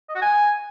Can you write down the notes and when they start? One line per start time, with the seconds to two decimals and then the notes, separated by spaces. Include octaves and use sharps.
0.09 D#5
0.15 F#4
0.22 G#5